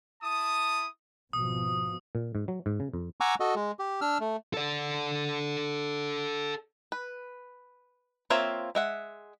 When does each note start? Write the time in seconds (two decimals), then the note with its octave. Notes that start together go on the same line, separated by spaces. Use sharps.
0.23 E4 A5 D#6
1.33 G#1 B2 F3 D#6
2.15 A#2
2.35 G#2
2.48 F#3
2.66 G#2
2.80 C#3
2.94 F2
3.21 F#5 G#5 A#5 C#6 D6 E6
3.40 F#4 A4 D#5
3.56 G#3
3.79 G4
4.01 D4 E6 F6
4.20 A3
4.54 A4 D5
6.92 B4
8.30 A#3 C4 F4 C#5 E5
8.75 G#3 E5 F#5